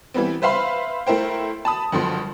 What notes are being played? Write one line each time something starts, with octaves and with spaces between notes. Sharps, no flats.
E3 G3 B3 C4
B4 C5 E5 F5 B5 C6
A3 E4 A#4 C5 G5
A5 B5 D#6
F#1 G2 D3 F3 C6